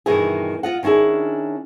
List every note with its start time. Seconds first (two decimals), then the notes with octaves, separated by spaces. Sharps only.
0.06 G2 B2 D#3 E3 E4 G#4
0.63 F4 D#5 F#5
0.83 D#3 C#4 D4 E4 G#4